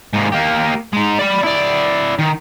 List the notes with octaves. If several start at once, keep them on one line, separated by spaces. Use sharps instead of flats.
G#2 A#3
A#3 G4
G#3 D#4
D5 B5
E4 D5
D#3